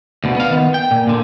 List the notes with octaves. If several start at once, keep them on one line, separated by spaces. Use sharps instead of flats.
D2 B2
B3 F5
D#3 B3
G5
A#2
A#2 D3